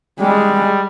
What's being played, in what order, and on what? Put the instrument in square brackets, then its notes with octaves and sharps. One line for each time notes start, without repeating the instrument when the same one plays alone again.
[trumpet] G3 [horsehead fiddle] G#3